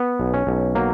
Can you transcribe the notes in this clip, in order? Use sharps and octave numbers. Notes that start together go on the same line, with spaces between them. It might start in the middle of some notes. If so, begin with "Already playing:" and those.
Already playing: B3
B1
C#4
B1
F#3 A#3